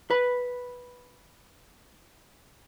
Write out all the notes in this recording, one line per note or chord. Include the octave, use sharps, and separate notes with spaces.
B4 B5